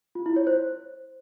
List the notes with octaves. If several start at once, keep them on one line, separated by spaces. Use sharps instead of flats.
F4
E4
C#5
C5